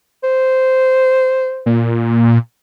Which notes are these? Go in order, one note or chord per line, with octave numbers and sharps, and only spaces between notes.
C5
A#2